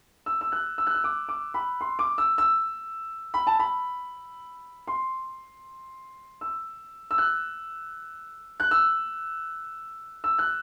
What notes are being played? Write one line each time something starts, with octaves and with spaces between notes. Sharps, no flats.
E6
E6
F#6
E6
F#6
E6
D6
D6
B5
C6
D6
E6
E6
B5
A5
B5
C6
E6
E6
F#6
F#6
E6
E6
F#6